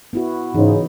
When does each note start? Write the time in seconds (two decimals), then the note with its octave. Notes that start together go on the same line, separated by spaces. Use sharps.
0.13 B3 E4 F#4
0.55 G#2 C#3 E3 D#4